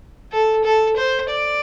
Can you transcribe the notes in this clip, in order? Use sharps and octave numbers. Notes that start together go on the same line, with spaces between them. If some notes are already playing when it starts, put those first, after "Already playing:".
A4
A4
C5
D5